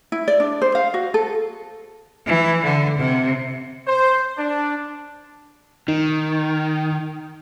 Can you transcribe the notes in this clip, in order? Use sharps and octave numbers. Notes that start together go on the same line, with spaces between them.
E4
D5
D4
C5
F5
F#4
A4
E3
D3
C3
C5
D4
D#3 D#4